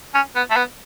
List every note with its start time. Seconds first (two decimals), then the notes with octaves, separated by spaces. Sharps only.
0.14 C#4
0.35 B3
0.50 A3
0.56 B3